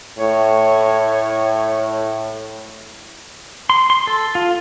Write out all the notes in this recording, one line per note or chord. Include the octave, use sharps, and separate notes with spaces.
A2 C#5
C6
C6
A4
F4